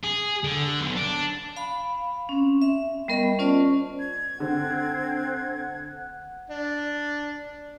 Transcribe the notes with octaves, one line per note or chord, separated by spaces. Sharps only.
G#4
D3
B1
D4
F5 B5
C4 C#4
E5
G3 B3 A#4 D#5 B5
C#4 F4 C5 D5 A5
G#6
D3 C4 F#5
D4